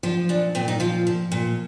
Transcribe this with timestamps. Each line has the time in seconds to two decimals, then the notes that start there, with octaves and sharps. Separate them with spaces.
0.03 F3 F4
0.29 A#2 D4
0.55 A#2 C4
0.68 D#4
0.80 F3 F4
1.07 F3
1.32 A#2